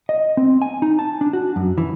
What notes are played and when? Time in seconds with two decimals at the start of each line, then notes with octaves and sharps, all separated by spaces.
0.09 D#5
0.37 C4
0.62 G#5
0.82 D#4
0.99 A5
1.21 D4
1.33 F#4
1.56 F#2
1.78 E3